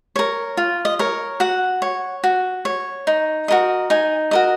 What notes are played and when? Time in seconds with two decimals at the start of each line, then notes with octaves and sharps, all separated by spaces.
0.16 A#4 C#5
0.57 F4
0.85 D#5
0.99 A#4 C#5
1.40 F#4 F#5
1.82 C#5
2.24 F#4
2.65 C#5
3.07 D#4
3.48 F#4 A#4 D#5
3.90 D#4 G#5
4.31 F#4 A#4 D#5